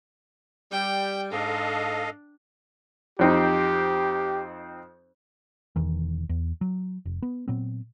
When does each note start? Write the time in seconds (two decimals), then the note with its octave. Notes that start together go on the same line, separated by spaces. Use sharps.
0.72 G3 G5
1.32 G#2 D4 A4 D#5 F5
3.19 F2 C4 D#4 G4
5.76 E1 E2 D#3 E3
6.29 E2
6.61 F#3
7.06 F1
7.22 B3
7.48 A#2 F#3 B3 C4